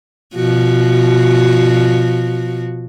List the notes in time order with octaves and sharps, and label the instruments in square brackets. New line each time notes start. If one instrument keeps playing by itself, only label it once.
[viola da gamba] B2 F3 F#4